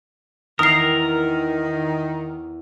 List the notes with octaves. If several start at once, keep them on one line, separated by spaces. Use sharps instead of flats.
E2 D#3 A#4 D#6 C7